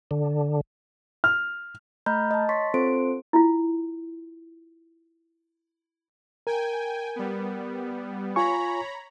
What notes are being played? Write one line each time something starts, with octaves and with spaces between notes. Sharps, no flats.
D3
F6
A3 D#5 A#5 B5 F6 G6
D#5 A5
C#5 C6 C#6 A6 B6
C4 F4 A4 C5 C6 D7
E4 F4
A#4 G5 G#5
G3 B3
F4 C#5 G#5 A#5 B5 C#6